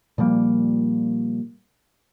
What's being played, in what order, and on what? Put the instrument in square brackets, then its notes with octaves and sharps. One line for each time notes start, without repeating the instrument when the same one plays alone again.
[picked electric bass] A#2 F3 G3 A#3